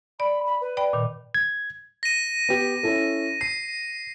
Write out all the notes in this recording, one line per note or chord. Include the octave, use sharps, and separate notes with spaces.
D5 B5
B5
B4
D5 G5 B5
A#2 D#3
G#6
A#6 D#7
B3 G4
C#4 E4 A4
C7 D#7